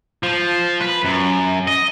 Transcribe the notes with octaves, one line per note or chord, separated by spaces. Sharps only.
F3
B4
F#2
D#5